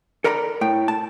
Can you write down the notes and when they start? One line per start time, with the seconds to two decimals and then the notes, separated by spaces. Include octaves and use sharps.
0.24 A4 A#4 D5 A#5 B5
0.61 A2 G5
0.88 A5